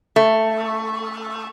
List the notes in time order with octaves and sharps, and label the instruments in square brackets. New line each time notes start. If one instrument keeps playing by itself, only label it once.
[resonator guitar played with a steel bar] A3